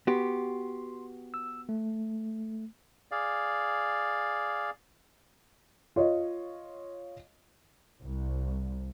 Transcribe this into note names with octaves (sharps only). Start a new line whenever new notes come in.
B3 F#4 G4 C6
E6
A3
G#4 D5 F5
F4 C#5 D#5
C2